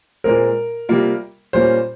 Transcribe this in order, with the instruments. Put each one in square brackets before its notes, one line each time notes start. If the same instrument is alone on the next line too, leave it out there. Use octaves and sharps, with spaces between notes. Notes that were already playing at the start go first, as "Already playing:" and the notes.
[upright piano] A#2 G#3 C4 [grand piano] A#4
[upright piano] C3 G3 A#3 F4
[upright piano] A#2 G3 A#3 C#4 F4 [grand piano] C5